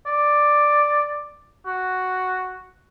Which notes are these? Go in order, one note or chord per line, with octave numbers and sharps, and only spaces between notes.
D5
F#4